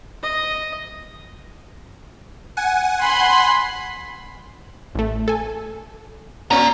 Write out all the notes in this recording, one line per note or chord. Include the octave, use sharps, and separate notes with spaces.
D#5
F#5 G#5
B5 C6
A1 A3
A4 G#5
B3 C#4 F#4 D5 A#5